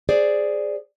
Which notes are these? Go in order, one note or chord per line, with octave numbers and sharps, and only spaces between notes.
G#4 C5 D5